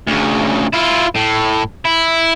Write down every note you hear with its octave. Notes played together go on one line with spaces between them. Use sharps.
D2 C#3
E4 F4
A2
E4